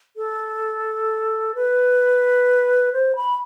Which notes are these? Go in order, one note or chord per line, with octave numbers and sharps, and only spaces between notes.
A4
B4
C5
B5